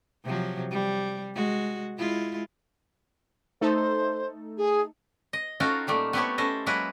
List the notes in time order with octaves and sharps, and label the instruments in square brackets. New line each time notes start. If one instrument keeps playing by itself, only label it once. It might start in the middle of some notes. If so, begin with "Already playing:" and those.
[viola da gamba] C3 F3 F#3
G3
G#3 F#4
G#3 E4 F4
[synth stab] A3 D#4 A4 [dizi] C5
[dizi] G#4
[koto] D#5
C#4 D#4 F4 F#4 A4 G5
A#2 G3 A3 A#3
B3 C4 E4 G4 A4 C#5
C#4 E4 A4 C5 D#5
F#3 G#3 A#3 E4 G#4 B4